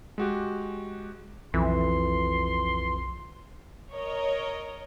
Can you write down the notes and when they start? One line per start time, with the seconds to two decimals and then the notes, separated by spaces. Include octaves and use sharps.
0.18 G#3 F#4 G4
1.54 B1 F2 E3 C6
3.92 A#4 C#5 D#5